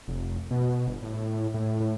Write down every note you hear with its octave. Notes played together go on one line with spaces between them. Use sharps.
F1
B2
G1
A2
A2
A2